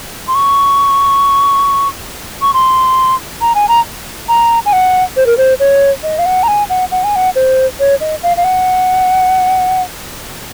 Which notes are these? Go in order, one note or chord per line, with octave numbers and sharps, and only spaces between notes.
C6
C#6
C#6
C6
A#5
G#5
A#5
A#5
G#5
F#5
C5
A#4
C5
C#5
D#5
F5
F#5
A#5
G#5
F#5
F#5
G#5
F#5
C5
C#5
D#5
F5
F5
F#5